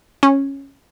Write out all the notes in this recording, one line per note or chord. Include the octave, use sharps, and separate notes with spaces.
C#4